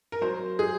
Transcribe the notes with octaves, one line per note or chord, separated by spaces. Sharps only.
A#4
F#3 C5
G#4